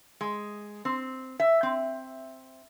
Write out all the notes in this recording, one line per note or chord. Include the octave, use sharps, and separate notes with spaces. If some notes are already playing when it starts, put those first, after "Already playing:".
G#3
C4
E5
C4